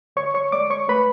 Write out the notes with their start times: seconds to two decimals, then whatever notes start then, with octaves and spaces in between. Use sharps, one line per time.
0.16 D2 C#5 C#6
0.34 C#5 C#6
0.52 G#3 D5 D6
0.70 C#5 C#6
0.88 A3 B4 B5